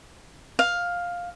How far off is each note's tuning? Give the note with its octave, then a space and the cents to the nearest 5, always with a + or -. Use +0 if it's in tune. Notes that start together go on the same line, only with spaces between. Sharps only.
F5 +10